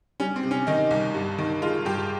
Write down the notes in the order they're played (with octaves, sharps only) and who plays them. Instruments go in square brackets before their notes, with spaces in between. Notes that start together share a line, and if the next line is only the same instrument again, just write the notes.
[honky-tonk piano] G3 C#4
C4
C3
C#4
D#3 D#4
C2
G2
D#3
G#3 F4
G2 G4